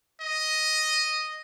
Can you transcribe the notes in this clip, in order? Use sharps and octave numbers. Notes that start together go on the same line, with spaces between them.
D#5